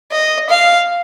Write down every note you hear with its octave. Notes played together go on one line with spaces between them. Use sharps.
D#5
F5